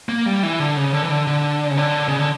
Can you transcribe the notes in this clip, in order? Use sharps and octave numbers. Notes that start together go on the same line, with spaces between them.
A#3
G3
E3
D3
C#3
D3
E3
D3
D3
C#3
D3
C#3
D3